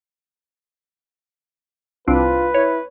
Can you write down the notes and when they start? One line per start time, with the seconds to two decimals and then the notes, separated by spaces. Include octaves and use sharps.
2.08 C2 C4 D4 F4 B4
2.54 E4 C#5